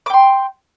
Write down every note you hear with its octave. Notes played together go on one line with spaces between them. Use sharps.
G5 C6 D6